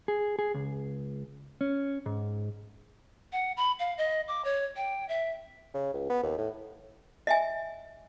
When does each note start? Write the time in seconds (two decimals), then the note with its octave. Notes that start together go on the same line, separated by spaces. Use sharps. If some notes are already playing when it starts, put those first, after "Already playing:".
0.08 G#4
0.39 G#4
0.54 C#2
1.61 C#4
2.06 G#2
3.33 F#5
3.57 B5
3.79 F5
3.98 D#5
4.28 D6
4.45 C#5
4.76 G5
5.09 E5
5.74 C#3
5.94 C#2
6.10 B3
6.23 D#2
6.38 A2
7.27 D#5 E5 G#5